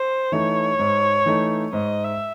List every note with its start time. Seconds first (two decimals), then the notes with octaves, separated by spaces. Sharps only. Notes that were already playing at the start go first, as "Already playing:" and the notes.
Already playing: C5
0.32 E3 A3 D#4 C#5
0.79 G#2
1.26 E3 A3 D#4
1.73 G#2 D#5
2.04 E5